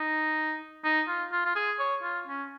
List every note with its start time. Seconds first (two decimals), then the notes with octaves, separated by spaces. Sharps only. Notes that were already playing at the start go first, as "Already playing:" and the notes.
Already playing: D#4
0.84 D#4
1.08 F4
1.32 F4
1.45 F4
1.56 G#4
1.79 C#5
2.03 F4
2.27 C#4